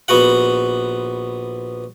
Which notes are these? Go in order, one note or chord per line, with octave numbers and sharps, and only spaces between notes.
A#1 B3 F#4 F#5